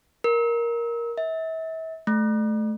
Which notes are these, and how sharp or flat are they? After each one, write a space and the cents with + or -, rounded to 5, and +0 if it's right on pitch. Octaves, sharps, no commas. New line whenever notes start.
A#4 +10
E5 -35
A3 -20